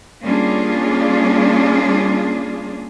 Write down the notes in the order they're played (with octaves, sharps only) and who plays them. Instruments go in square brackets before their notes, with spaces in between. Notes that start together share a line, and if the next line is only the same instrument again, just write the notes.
[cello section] G3 A#3 C#4 D4 F4 G#4